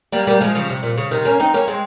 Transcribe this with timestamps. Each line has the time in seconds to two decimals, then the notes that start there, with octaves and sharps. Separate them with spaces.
0.12 G3 A#3
0.27 G3 A#3
0.41 F3 G#3
0.55 C#3 F3
0.70 C3
0.83 A#2
0.98 C#3
1.11 C3 D#3
1.25 A#3 C#4
1.40 C4 D#4
1.54 A#3 C#4
1.68 G#3 C4